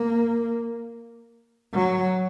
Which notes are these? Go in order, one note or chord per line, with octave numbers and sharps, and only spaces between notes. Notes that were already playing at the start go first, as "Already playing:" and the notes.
Already playing: A#3
F#3